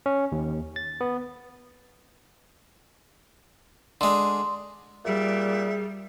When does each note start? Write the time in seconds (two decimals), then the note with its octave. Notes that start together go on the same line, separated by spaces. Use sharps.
0.06 C#4
0.32 D#2
0.76 A6
1.01 B3
4.01 D3 G#3 C6
5.05 A#2 G3 G#4 E5